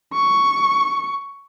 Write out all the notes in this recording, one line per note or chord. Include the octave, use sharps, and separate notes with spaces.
C#6